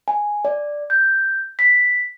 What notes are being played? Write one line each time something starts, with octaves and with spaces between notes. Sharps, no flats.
G#5
D5
G6
B6